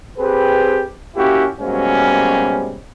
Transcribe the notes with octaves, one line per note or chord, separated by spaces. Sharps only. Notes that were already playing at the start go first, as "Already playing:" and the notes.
C4 G4 G#4 B4
A#3 C#4 E4 F#4 G4
G#2 B2 F#3 G3 A#3 C#4